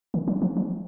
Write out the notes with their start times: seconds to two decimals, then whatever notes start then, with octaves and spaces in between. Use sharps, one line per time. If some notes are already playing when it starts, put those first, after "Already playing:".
0.14 D#3
0.28 F#3
0.42 F3
0.57 F3